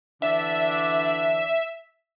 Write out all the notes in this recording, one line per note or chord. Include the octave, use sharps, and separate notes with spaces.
D3 E3 D4 E5